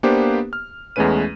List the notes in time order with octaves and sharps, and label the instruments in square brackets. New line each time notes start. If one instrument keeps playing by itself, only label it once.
[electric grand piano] A#3 B3 D4 G4 B4 C5
F6
E2 G#3 A3 C#4 B4 D#7